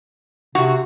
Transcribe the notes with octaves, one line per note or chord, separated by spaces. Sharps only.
C3 F#4